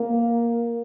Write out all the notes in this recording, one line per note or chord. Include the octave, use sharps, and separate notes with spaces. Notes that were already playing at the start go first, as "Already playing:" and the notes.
Already playing: A#3